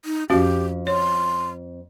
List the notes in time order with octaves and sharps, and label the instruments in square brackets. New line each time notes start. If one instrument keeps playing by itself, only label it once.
[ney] D#4
[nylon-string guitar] F2 F5 [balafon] C#4 F#4 [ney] G4
[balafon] C#5 [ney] C6